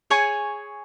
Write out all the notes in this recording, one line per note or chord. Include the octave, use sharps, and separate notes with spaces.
G#4 C#5 G#5 C#6